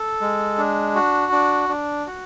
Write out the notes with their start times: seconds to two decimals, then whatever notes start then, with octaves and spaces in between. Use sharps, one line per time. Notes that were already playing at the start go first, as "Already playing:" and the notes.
Already playing: A4
0.21 G#3
0.58 D4
0.95 F#4
1.32 D4
1.69 D4
2.07 F#4